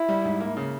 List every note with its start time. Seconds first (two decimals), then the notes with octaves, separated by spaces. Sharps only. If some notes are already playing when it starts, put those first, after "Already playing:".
Already playing: E4
0.09 G3
0.25 G#2
0.40 A#3
0.57 C#3